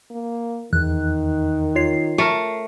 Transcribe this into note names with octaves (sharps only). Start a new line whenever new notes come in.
A#3
E2 D#3 F#6
F4 C#5 C7
A3 A#4